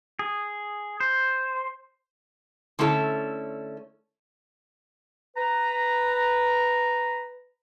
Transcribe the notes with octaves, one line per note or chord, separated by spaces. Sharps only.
G#4
C5
D3 A3 C#4 E4 A4
B4 A#5